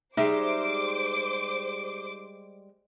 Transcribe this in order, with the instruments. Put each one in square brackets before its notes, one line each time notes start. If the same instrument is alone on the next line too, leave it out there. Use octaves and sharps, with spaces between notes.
[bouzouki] G3 G#3 [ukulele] D#4 E5 [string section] C5 D6